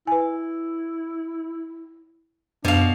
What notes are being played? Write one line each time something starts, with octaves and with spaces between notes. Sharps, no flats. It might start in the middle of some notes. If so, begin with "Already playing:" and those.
E4 B4 G#5
F#2 B2 D4 F5